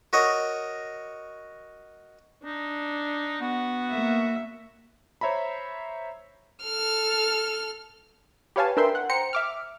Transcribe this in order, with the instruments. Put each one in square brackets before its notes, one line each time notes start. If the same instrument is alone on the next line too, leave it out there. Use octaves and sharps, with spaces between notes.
[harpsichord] F#4 A#4 C#5 D#5
[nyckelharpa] D4 [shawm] D#4
[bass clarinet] B3 [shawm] F#4
[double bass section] A#3 [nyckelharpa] E5
[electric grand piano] C5 C#5 E5 A#5 B5
[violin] A4 F6
[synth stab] G4 B4 C#5 F5 G#5 A5
D4 A#4 B4 E5 G5 C6
F#5
C5 G5 A#5 C#7
E5 D6 F6